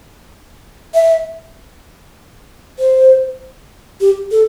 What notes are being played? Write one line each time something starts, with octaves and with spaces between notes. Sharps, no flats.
E5
C5
G4
A4